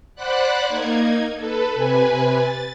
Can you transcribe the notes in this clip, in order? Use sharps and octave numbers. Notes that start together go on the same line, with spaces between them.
C5 D5 F#5 B5 F#6
A#3 D#4 G#6
A4 B4
C3 B4 G#5
A6